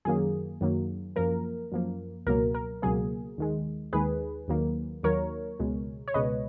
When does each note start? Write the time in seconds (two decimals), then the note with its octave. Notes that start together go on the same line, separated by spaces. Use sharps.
0.05 F#2 D#3 F#3 A#3 G#4
0.61 F#2 D#3 F#3 A#3
1.16 F#2 F3 A#3 A#4
1.72 F#2 F3 A#3
2.27 C#2 B2 F#3 A#3 A#4
2.55 A#4
2.82 C#2 B2 F#3 A#3 G#4
3.38 D#2 D#3 G#3
3.93 D#2 D#3 G#3 G#4 B4
4.48 D#2 D#3 F#3 A#3
5.03 D#2 D#3 F#3 A#3 A#4 C#5
5.60 C#2 B2 G#3
6.08 C#5
6.14 C#2 B2 G#3 B4 D#5